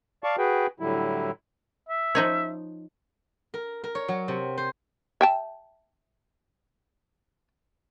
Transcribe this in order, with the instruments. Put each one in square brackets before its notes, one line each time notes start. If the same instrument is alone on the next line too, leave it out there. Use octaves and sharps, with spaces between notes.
[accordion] D5 F5 A5 C#6
F#4 G#4 B4 G5
A2 D3 F#3 G3 E4
[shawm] E5
[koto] F3 D#4 C#5
[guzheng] A#4
A#4
C#5
F#3
C3
C5
[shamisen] E5 G5 A5